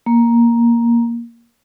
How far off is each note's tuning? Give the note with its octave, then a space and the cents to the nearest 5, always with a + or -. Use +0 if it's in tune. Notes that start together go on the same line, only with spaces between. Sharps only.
A#3 +10